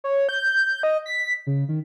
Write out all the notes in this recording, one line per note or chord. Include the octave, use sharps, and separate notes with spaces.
C#5
G6
D#5
B6
C#3
D#3